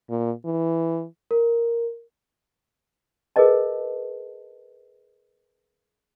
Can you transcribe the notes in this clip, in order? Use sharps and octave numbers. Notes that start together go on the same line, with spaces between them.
A#2
E3
A#4
G#4 A#4 B4 D#5 A5